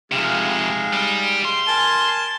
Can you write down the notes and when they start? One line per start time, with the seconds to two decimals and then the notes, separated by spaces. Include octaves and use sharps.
0.12 F2 C3 G#3 D#4 F5
0.93 G3
1.45 C6
1.68 A#4 G#5 A5